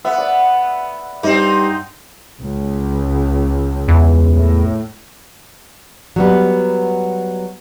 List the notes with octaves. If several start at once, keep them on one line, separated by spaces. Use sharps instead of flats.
B3 E5 F#5
D5
G2 C4 D#4
C#2
E2
A2
F#3 G3 B3